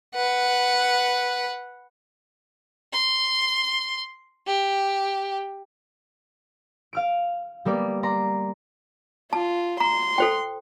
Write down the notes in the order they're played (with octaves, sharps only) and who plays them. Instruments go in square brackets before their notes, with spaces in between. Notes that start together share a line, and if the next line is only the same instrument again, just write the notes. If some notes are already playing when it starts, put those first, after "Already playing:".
[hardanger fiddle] B4 F#5
[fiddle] C6
G4
[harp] F5 F6 D7
G3 A#3 B3 D5
D5 A#5 C6
[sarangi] F4 [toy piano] A5
[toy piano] A#5 [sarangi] C6
[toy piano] A4 C5 G5